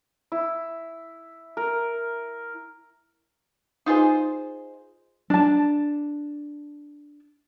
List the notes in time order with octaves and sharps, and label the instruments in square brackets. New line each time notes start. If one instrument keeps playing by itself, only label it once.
[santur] E4
A#4
[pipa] D#4 F4 G#4 C5
[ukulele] D4 A5